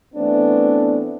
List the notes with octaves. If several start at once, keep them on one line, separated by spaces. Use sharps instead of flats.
E3 A3 B3 C4 D4